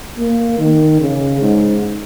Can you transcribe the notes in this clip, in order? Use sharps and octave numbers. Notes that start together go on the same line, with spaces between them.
A#3
D#3
C#3
G#2